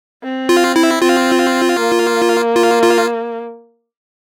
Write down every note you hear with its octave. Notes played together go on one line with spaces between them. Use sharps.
C4
F4
E4
C4 F4
A#3
F4
F4